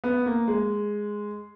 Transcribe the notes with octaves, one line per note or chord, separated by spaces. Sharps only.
B3
A#3
G#3